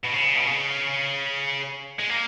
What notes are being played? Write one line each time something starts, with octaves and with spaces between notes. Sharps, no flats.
B2
C#3
B2
C#3
G#3
A#3